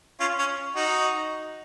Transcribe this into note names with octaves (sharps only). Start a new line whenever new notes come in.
C#4 F4
C#4
D#4 F#4